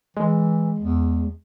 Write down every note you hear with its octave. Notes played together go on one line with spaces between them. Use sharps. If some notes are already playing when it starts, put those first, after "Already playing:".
E3 G#3
E2